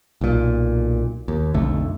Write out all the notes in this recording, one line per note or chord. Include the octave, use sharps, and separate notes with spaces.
B1 A#2
D#2
B1 F2 D3 A3